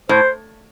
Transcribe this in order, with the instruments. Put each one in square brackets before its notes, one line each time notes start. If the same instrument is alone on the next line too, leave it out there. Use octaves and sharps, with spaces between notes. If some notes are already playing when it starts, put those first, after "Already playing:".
[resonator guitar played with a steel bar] A2 [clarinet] C5